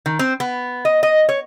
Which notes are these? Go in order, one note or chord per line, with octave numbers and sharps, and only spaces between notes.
D#3
C4
B3
D#5
D#5
C#5